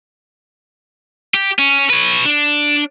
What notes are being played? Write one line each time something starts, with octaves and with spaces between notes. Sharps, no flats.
G4
C#4
B4 C#5
D4